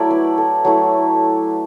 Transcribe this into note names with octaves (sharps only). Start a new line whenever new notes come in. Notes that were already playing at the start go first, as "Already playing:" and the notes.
Already playing: F#3 A3 E4 D5
B4
A4
F#3 A3 E4